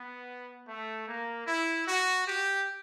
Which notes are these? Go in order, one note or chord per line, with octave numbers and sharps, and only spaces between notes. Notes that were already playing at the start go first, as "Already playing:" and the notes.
Already playing: B3
A3
A#3
E4
F#4
G4